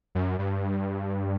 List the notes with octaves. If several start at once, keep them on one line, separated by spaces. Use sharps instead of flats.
F#2
G2